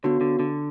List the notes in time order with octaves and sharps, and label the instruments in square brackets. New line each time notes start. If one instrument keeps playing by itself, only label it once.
[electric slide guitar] D3 [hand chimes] B3 F#4 C#5
[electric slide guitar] D3
D3